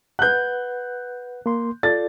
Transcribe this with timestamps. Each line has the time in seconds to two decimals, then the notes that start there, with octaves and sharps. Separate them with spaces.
0.19 B4 F#5 F#6 G6
1.46 A#3 C6
1.83 F4 A4 D5 A6